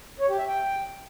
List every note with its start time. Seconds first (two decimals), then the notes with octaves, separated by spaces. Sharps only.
0.20 C#5
0.29 G4
0.38 E5
0.47 G5